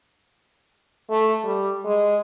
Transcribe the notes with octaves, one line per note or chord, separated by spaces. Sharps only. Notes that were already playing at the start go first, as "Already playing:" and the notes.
A3
G3
G#3